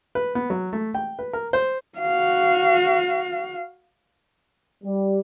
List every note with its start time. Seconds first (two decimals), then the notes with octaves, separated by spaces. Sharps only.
0.15 B4
0.35 B3
0.50 F#3
0.73 A3
0.95 G5
1.19 B4
1.33 A#4
1.53 C5
1.99 F#4 F5
4.84 G3